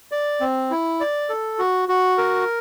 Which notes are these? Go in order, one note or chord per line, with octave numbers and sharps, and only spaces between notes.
D5
C4
E4
D5
A4
F#4
F#4
A#4